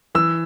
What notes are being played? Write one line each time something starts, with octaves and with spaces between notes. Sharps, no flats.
E3 E6